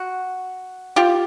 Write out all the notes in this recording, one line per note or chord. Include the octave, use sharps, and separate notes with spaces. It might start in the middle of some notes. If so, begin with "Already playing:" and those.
Already playing: F#4
F4 G4